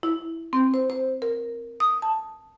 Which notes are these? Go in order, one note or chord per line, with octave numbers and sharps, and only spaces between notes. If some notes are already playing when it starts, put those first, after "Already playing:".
E4
C4
C5
C5
A#4
D#6
A5